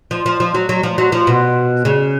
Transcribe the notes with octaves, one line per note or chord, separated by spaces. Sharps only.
F3
F3
F3
F#3
F#3
F3
F#3
F3
B2
C#3